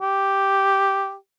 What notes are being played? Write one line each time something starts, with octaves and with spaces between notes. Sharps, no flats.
G4